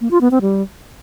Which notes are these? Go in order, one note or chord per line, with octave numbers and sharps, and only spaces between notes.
A#3
F4
B3
C4
G3